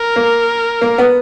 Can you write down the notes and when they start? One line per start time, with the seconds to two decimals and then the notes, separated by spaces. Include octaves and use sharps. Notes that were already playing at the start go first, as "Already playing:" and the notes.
Already playing: A#4
0.16 A#3
0.81 A#3
0.98 B3